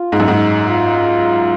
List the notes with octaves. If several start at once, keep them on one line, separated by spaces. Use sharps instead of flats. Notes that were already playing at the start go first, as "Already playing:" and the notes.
Already playing: F4
G#2
F#2
G#2
F4